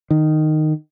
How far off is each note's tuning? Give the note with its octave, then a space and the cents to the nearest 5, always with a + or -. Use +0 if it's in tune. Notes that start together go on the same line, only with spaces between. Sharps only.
D#3 -10